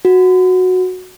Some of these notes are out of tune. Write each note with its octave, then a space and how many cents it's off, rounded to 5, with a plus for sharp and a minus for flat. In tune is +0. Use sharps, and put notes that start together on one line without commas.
F#4 -10